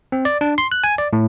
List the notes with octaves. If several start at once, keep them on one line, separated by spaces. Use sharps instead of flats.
C4
D5
D4
C6
F#6
G#5
D5
A2